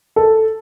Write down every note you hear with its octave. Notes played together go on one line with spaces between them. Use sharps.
A4